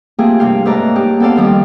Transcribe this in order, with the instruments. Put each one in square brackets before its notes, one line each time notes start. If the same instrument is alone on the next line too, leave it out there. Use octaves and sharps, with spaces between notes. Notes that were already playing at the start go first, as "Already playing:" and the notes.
[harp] A3 A#3 C4 F4 G4 G#4
G2 C3 F5 G5
G#2 A3 B4 C#5 D5 A#5
A#3 D#4 G4
B3 C4 A4 D5 F5
F2 D#3 G3 C4